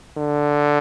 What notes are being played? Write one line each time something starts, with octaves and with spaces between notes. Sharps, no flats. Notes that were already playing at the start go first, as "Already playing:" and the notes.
D3